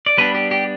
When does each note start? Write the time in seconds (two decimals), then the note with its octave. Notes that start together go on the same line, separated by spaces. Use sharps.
0.06 D5
0.18 G3 B3 D4 B4
0.35 G4
0.51 G4